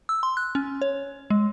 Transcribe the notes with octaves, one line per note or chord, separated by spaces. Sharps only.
E6
C6
F#6
C#4
C#5
G#3